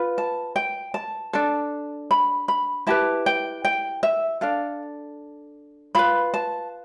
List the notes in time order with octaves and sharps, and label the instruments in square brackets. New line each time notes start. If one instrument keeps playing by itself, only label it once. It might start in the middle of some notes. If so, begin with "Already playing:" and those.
Already playing: [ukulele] F4 B4
A5
G5
A5
D4 A4
B5
B5
E4 G4 B4 A5
G5
G5
E5
D4 A4 F5
F4 B4 B5
A5